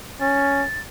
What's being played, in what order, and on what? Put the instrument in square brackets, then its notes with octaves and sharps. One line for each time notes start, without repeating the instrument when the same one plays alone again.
[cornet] C#4 [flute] A6